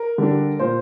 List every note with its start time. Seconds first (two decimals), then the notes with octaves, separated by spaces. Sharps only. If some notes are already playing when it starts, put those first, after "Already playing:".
Already playing: A#4
0.18 D3 G3 D4
0.59 A#2 C5